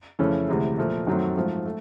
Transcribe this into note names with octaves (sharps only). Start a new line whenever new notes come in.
F2 C#3 E3 A3 C#4
D2 C3 E3 G#3
A#2 F3 A3
F#2 D#3 F#3 A3 C4
G#2 F3 A3
A3